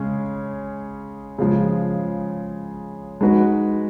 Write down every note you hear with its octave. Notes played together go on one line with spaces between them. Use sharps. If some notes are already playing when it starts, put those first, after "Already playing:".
Already playing: C#3 G#3 C#4
C#3 F3 G#3
G#3 D#4 F#4 B4